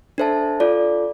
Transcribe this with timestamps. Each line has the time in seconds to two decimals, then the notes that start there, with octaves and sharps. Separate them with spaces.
0.18 D4 A4 C5 E5 A5
0.60 F4 A4 D5